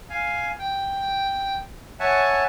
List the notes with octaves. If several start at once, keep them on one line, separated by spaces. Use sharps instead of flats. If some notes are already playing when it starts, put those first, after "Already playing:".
F5 G#5
G5
C#5 E5 F#5 G#5 A5